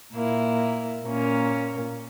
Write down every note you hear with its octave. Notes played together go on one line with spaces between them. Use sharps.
A#2 A#3 E4
A#2 A#3 C#4